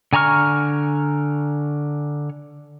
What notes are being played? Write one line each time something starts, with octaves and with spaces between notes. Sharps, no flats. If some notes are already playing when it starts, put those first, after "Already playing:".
D3 G#5 A#5 C#6 F6